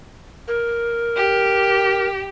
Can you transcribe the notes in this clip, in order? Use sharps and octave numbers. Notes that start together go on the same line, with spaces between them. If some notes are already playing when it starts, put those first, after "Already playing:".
A#4
G4